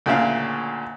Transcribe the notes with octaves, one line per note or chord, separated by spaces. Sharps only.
D2 A#2 C#3 E5 F5